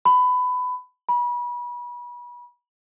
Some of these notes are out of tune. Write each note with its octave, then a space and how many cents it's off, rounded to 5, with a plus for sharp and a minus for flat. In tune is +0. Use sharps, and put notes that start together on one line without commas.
B5 +20
B5 -30